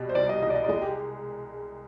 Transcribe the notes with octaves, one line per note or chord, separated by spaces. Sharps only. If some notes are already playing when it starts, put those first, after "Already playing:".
Already playing: B2 G3
C5
C2 D5
D#5
C2 D#5
D5
D#5
D5
G#3 D#5
G4